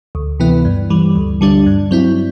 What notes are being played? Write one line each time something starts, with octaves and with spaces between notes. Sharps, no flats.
D2
C3 E3 B3 E4
G2
E3 G3
D2
D3 G3 D4
G2
F#3 C4 E4